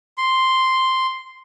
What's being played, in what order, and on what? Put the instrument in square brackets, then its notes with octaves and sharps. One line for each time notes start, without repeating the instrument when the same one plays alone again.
[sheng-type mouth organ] C6